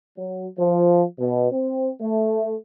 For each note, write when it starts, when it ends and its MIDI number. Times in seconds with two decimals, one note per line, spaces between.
0.17 0.47 54
0.58 1.03 53
1.19 1.51 47
1.51 1.90 60
2.00 2.54 57